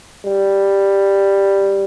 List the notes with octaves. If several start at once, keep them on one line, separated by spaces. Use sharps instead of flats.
G3